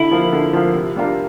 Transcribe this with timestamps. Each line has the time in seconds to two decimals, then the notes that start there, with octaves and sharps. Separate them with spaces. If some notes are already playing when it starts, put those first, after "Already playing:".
Already playing: D3 E4
0.11 F3 A#3 F4
0.32 D3
0.53 F3 A#3 F4
0.75 C3
0.96 G3 D4 F4 A#4